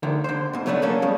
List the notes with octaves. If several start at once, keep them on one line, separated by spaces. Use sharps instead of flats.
D2 D3 D#3
D3 C5
G#2 B2
C#2 F#3 A3 B3 D4
A3 A#3 C#4 A4
F2 A2 G3 G#3